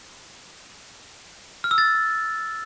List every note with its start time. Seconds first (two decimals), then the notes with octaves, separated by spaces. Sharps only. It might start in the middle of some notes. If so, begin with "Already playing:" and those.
1.64 F6
1.71 E6
1.78 A6